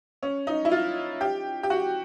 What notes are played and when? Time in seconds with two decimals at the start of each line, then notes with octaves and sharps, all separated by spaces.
0.23 C#4
0.47 D#4
0.65 E4
0.72 F4
1.21 G4
1.63 G4
1.70 F#4